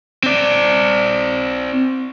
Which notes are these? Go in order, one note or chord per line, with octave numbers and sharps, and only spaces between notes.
C4 D5